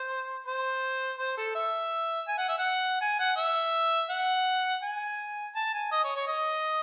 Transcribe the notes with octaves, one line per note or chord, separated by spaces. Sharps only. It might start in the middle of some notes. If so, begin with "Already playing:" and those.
Already playing: C5
C5
C5
A4
E5
G#5
F#5
E5
F#5
G#5
F#5
E5
F#5
G#5
A5
G#5
D#5
C#5
C#5
D#5